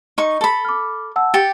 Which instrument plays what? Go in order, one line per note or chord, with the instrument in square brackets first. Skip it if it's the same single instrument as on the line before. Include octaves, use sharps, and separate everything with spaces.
[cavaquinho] D#4 C#6
A4 B5
[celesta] D6 F6
F#5 A5 E6
[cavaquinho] G4 [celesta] A6 C#7 G7